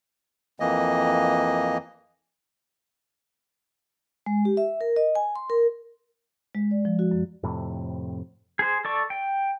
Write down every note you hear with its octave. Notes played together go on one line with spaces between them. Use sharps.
F2 E3 A#3 D#5
G#3
G4
E5
A#4
D#5
G#5
C6
A#4
G#3
D5
F3
F#4
F#2
F2 A2 C3
G#4 C5
A4 D5 C#6
G5